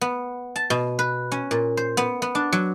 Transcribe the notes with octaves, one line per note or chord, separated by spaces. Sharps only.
B3
A5
B2
B4
C#4
A#2
C5
B3
B3
D4
F#3